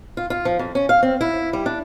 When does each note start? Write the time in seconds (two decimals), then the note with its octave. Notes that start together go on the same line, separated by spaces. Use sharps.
0.17 F4
0.30 F4
0.45 F3
0.59 F2
0.75 C#4
0.89 F5
1.03 C4
1.21 E4
1.53 G3
1.66 D4